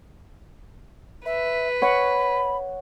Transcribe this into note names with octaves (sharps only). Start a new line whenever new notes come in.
B4 E5
C#5 F#5 B5